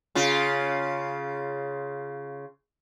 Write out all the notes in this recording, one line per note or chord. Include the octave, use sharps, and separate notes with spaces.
C#3 F4